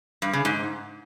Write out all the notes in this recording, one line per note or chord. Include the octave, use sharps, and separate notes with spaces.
G2
C#3
G#2